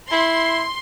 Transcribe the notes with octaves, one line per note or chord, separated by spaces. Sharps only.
E4 C6